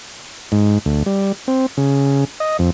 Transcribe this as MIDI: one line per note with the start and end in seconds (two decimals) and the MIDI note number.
0.52 0.78 44
0.86 1.03 38
1.06 1.32 55
1.48 1.66 60
1.77 2.25 49
2.40 2.57 75
2.59 2.70 41